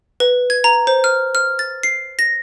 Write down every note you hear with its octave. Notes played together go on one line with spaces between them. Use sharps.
B4
G#6
A#5
C5
F6
F6
A6
C7
A#6